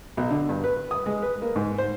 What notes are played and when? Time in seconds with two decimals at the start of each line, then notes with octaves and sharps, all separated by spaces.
0.17 B1
0.30 D3
0.49 G2
0.64 B4
0.91 D#6
1.06 G#3
1.22 B4
1.42 A#3
1.56 G#2
1.78 C5